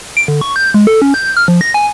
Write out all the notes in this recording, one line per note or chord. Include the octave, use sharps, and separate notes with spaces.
D7
D3
C#6
G6
G#3
A4
C#4
G6
F6
F3
A#6
G#5